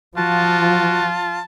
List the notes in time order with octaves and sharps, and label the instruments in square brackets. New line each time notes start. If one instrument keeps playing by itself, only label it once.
[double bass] F3 [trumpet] F4 [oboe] F#4 [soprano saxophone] A5